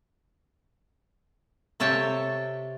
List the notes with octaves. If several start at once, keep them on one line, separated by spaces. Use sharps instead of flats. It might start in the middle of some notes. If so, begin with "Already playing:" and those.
C3 A4 C#5 G5 A5